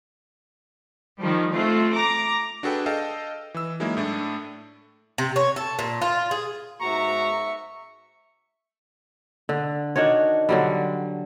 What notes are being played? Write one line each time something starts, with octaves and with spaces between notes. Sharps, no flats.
D#3 F3 G3
A3 C4 F4
A#5 D6
D4 F#4 G#4 A4 B4 G5
A4 D#5 F5 G5 A5
E3 E6
F#3 G#3 A#3 D#4 E4
A2 A3 D4
C3
C#5
A4
A#2
F4
G#4
G#2 F#4 E5 A#5 C#6
D3
D#3 D4 F#4 C#5
D3 F#3 G3